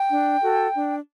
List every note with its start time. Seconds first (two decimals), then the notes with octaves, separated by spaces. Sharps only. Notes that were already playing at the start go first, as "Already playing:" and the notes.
Already playing: G5
0.10 D4
0.41 F#4 A4
0.74 D4